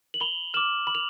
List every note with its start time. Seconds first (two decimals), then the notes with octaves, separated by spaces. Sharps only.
0.14 F#7
0.20 B5 F7 G7
0.54 D6 F6 E7 F#7
0.87 B5 F#7
0.95 F7